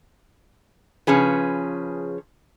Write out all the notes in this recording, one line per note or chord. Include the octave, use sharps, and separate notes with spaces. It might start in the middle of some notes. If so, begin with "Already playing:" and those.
C#3 F3 C#4 G#4 B4